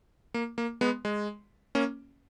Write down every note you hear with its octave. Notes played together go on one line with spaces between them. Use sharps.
A#3
A#3
G#3 B3
G#3
A#3 C#4